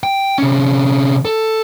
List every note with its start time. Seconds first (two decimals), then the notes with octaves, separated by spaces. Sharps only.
0.03 G5
0.38 C3 C#4
1.25 A4